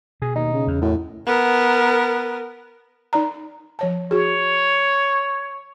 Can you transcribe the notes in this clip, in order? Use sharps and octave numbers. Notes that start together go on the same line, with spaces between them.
B2 G#4
D#2 D#4
C#3
E2
F#2 A2
B3 A#4
D#4 D5 A#5
F3 C#5 A5
F#4 G#4 C#5